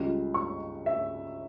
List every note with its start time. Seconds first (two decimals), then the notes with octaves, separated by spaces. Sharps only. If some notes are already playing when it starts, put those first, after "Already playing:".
Already playing: C#2 C#3 G3
0.34 C#6
0.86 E5